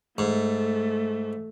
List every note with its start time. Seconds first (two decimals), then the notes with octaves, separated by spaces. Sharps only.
0.18 G#2 A3